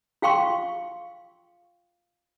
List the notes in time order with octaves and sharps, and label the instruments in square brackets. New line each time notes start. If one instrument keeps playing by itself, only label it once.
[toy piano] F4 F5 G5 C6 C#6